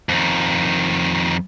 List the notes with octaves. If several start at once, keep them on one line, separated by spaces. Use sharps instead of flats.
F2 D#3